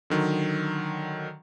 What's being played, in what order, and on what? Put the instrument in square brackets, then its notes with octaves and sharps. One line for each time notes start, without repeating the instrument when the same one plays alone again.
[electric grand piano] D3 D#3 F#3